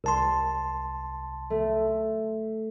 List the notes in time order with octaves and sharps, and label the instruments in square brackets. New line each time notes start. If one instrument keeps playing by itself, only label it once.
[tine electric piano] C2 A5 C6
[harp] A3